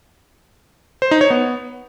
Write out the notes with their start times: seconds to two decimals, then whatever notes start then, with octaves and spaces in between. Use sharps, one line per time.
1.02 C5
1.11 D#4
1.21 C#5
1.30 B3